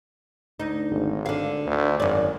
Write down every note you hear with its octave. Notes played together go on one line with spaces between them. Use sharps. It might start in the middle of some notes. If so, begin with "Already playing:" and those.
D2 D#4
G#1
D3 F5
D2
G#1 F#2 D5